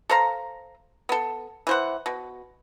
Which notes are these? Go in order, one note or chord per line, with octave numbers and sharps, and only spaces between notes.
A4 C5 F5 A#5
B3 A4
E3 C5 F#5
B2